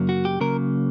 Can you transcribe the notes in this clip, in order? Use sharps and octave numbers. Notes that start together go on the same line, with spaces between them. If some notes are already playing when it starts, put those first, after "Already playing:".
Already playing: F#2 C#3 F#3 A#3
F#4
G4
C#3 F#3 A#3 A#4